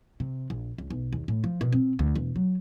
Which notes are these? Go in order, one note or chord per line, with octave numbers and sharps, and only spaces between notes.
C3
A#1
C#2
B1
D#2
A2
F3
B2
C4
D2
E1
F#3